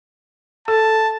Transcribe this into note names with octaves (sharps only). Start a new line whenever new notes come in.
A4 A5